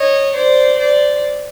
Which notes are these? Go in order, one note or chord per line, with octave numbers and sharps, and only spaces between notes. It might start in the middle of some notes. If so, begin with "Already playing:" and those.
Already playing: C#5 D#5
C5 D5
C5 D5